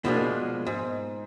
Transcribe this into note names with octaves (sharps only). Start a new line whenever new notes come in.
B2 F3 G#3 A#3 D4
G#2